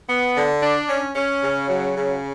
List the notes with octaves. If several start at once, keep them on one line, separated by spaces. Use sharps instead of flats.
B3
D3
D4
C#4
C#4
C#3
F#3
C#3